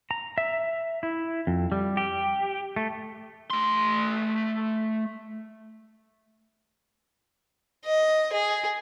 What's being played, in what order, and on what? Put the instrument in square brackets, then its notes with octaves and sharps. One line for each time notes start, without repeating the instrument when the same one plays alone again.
[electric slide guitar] A#5
E5
E4
F2
G3
G4
A3
[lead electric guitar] A3 C6
[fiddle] D#5
G#4